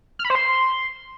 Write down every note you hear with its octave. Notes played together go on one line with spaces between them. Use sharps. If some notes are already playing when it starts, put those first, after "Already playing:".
F6
B5
C5
C6